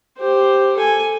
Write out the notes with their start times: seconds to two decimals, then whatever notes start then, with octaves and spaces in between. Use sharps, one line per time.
0.19 G4 C5
0.77 A4 G#5